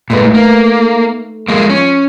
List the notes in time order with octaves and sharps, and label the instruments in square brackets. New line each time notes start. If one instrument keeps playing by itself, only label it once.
[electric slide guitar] A#2 G#3 [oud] A3 D#4 B4
[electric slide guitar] A#3
[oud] F3 [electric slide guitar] G#3 A#3
[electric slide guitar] C#4